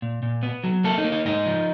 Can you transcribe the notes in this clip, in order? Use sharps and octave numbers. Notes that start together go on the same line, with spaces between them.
A#2
A#2
B3
F#3
A#3 A4
D#4
A#3
D#4
G#2 D#4
F3